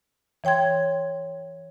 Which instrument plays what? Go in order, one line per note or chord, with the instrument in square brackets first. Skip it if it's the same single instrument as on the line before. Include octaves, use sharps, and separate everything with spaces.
[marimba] E3 C#5 G5 C6 G#6